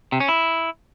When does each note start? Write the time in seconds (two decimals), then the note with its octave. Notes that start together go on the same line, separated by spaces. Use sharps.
0.12 C3
0.20 C#4
0.28 E4